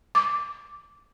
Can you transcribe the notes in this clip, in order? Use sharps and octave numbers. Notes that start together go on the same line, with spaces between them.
D6